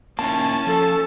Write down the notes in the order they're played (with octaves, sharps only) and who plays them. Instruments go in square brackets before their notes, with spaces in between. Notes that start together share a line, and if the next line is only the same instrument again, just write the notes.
[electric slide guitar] A#3 D#4 E4 [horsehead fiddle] C#4 [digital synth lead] A5
[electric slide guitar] F3 [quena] A4